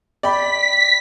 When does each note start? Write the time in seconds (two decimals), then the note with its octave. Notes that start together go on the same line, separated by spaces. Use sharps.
0.23 D5 G5 B5 B6